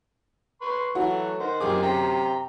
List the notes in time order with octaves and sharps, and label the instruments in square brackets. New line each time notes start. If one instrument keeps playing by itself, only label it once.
[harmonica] B4 C6 C#6
[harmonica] E3 A3 [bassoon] F#3 [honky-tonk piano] F#4
[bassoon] D#3 [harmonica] C5 F#5
[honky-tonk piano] F#2 G4 D6 [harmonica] C4 F4 G#4
[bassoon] C3 [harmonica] G5 A#5